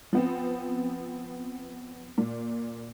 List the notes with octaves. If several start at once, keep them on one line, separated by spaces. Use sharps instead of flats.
F3 B3 C4
A#2